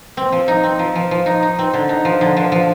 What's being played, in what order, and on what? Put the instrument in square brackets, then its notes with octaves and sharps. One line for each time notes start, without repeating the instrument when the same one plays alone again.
[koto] C4
F3
D#4
C4
F3
F3
F3
D#4
D#4
C4
D3
D#4
F3
D3
F3
F3